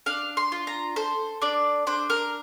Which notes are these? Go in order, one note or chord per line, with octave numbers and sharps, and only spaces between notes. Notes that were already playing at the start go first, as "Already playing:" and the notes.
D4 F5
C6
F4
A#5
A4 C5
D4 D5
D4 C5
A#4